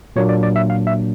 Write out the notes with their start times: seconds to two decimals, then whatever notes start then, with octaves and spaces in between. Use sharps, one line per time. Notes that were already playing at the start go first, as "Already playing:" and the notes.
0.16 A#2 F#3 A#3 D4 C#5
0.29 D5
0.43 D5
0.56 E5
0.70 F5
0.87 E5